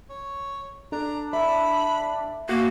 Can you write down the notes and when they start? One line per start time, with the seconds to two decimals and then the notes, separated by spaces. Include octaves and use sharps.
0.10 C#5
0.92 D4 A4 A#5
1.33 E5 B5
2.49 A#3 F#4 F5